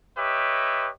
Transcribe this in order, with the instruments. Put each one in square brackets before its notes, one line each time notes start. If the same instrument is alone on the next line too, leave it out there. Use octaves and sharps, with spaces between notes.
[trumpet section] G4 B4 C#5 D#5 E5